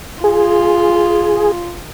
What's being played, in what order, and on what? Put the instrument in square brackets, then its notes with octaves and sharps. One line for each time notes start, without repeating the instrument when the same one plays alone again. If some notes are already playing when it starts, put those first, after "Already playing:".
[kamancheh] F4 [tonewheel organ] G#4